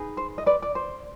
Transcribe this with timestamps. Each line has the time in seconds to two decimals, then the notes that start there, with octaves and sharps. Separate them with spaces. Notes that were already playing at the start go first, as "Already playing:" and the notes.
Already playing: D#4 G#4 B4
0.17 C5
0.38 D#5
0.46 B4 D5
0.62 D5
0.75 C5